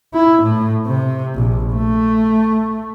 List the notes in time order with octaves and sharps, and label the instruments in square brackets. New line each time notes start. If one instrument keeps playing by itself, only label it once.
[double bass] E4
A2
C3
A#1
A3